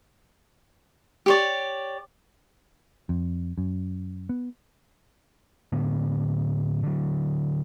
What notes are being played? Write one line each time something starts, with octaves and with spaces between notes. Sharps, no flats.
G4 C#5 D5
F2
F#2
B3
A2 D3 B3
D3 F#3